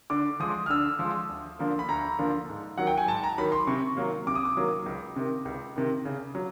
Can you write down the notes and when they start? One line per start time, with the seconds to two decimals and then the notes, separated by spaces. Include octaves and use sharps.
0.10 D3 D6
0.40 F3 G#3 D#6
0.66 F6
0.70 D3 E6
0.99 F3
1.04 G#3
1.29 D2
1.59 D3 F3 A#3
1.79 B5
1.88 D2 A#5
2.19 D3 F3 A#3
2.49 G#2
2.78 D#3 F#3 F#5
2.87 G5
2.98 G#5
3.08 G#2 A5
3.23 A#5
3.38 D#3 F#3 B5
3.52 C6
3.67 C3 C#6
3.97 D#3 F#3 A#3
4.27 C3 D6
4.35 D#6
4.45 D6
4.57 D#3 F#3 A#3
4.86 C#2
5.16 C3 D#3
5.45 C#2
5.76 C3 D#3
6.05 C#3
6.35 F#3